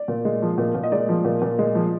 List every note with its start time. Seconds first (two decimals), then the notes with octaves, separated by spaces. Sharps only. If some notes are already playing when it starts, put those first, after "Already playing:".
Already playing: D5
0.08 A#2
0.25 G#3
0.42 F3
0.58 A#2
0.75 A#2
0.83 D#5
0.92 G#3 D5
1.09 F3
1.25 A#2
1.42 A#2
1.59 G#3
1.75 F3